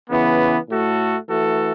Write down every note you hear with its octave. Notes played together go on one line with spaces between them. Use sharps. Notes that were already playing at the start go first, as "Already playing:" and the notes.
C#3 E3 B3
A2 A3 F#4 A4
E3 A3 F#4 A4